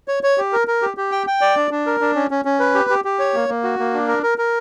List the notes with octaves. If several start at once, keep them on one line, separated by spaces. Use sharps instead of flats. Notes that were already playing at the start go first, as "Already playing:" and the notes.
C#5
C#5
G4
A#4
A#4
G4
G4
G5
G5
D5
D4
D4
A#4
D4
C#4
C#4
C#4
B4
G4
G4
G4
C#5
A#3
A#3
F#4
A#3
D4
A#4
A#4
A#4